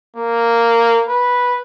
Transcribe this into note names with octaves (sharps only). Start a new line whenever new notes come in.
A#3
B4